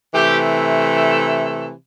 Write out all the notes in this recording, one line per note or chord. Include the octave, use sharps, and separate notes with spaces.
C3 E3 A3 G4